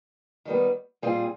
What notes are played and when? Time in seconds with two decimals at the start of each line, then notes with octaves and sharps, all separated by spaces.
0.45 D#3 G3 B3
1.02 A#2 G3 C4 F4 G#4